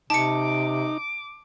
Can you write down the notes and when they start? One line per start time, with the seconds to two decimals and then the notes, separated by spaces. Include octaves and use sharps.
0.10 C3 D#4 A5 D6 C#7